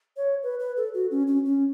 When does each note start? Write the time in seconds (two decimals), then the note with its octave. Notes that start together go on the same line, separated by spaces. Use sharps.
0.17 C#5
0.43 B4
0.60 B4
0.77 A4
0.94 F#4
1.11 C#4
1.27 C#4
1.45 C#4